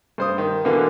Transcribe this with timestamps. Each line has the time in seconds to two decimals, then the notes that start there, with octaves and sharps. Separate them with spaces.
0.18 G2 C5 D#6
0.38 D#3
0.64 B2 D3 E3 A#3 B3